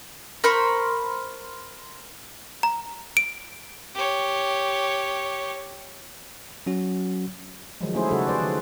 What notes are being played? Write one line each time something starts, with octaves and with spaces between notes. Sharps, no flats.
A#4 C5 B5 C#6
A#5
D7
G4 C#5
F#3 C#4 F#4
D#3 F3 F#3 G#3
A3 C#4 E4 G#4 C5
C#3 G3 F#4 A4
G#4 B4 C5 D5
D#3